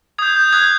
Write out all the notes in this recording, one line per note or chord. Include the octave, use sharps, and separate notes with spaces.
D#6 G6 G#6
G6
D#6 F#6 G#6